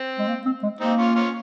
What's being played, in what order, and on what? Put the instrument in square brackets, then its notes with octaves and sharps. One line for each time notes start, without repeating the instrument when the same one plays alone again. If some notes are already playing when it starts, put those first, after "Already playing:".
Already playing: [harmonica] C4
[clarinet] G#3
A#3
C4
G#3
[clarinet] A#3 [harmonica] C4 D#4
[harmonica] C#4 F4
C#4 F4